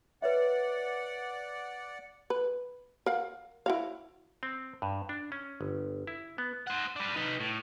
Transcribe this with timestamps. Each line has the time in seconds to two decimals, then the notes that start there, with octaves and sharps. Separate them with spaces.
0.22 B4 C#5 D5 E5 F#5
2.30 B4
3.06 A#4 F5 F#5
3.66 E4 F#4 F5
4.43 C4
4.82 G2
5.09 D4
5.32 C#4
5.61 G1
6.07 E4
6.38 B3
6.67 C5 F#5
6.96 D4 B4
7.16 D#4 B4
7.40 A2